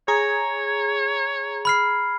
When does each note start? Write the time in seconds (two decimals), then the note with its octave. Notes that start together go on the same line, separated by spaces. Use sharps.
0.08 G#4 C#5 A#5 G#6
1.65 B5 F6 C7